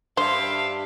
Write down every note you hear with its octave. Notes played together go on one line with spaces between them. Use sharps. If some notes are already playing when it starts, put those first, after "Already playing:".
G2 C5 E5 F5